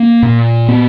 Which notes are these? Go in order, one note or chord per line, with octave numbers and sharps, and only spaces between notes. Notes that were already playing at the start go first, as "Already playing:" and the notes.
Already playing: A#3
A#2
B3